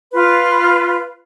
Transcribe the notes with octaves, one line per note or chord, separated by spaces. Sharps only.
F4 B4